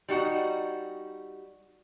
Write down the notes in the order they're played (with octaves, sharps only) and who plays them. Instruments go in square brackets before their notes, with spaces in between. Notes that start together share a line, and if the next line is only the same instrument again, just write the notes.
[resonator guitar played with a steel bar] G3 D#4 F#4